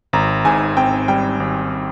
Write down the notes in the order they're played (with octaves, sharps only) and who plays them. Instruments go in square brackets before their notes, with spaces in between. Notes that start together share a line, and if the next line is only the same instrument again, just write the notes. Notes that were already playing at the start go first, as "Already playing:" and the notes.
[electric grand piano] G#1 [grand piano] A#5
[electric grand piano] G#2 [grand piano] G#5
[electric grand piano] C4 [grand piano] G5
[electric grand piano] G3 [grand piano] G5
[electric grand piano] G#1